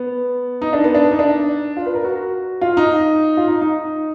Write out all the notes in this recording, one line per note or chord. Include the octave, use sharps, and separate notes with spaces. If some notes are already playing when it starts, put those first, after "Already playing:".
Already playing: B3
D#4
D4
B3
D4
D#4
D4
F4
B4
A#4
F#4
F4
D#4
F4
D#4
D#4